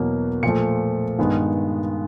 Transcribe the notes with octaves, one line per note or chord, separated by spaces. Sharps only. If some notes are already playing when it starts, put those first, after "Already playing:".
Already playing: E2 B2 F#3 A#3
A#2 F3 A3 C#7
G2 D#3 G#3 B3